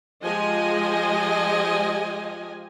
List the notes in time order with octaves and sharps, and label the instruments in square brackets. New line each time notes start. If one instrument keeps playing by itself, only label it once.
[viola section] F3 G#3 G4 D#5 G#5